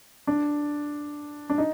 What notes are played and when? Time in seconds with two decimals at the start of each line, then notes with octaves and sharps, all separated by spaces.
0.27 D4
1.50 D4
1.58 D#4